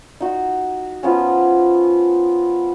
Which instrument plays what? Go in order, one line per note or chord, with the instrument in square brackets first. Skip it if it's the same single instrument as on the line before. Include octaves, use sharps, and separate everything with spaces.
[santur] D#4 F#4
F3 B3 C#4